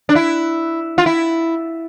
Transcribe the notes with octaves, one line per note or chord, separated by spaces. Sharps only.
D4
E4
F4
E4